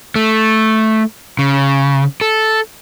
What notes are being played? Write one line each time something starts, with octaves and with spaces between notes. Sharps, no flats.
A3
C#3
A4